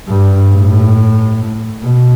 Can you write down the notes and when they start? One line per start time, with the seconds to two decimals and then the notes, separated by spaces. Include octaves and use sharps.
0.08 G2
0.52 A2
1.83 B2